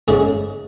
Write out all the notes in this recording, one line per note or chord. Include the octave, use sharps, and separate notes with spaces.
G#2 G#3 C#4 G#4